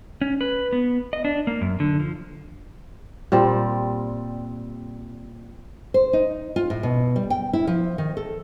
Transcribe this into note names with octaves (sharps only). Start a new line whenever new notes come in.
C#4
B4
B3
D#5
D4
A#3
F#2
D3
F3
A#2 G3 C4
C5
D#4
F4
A2
B2
G3
G5
E4
F3
D#3
A4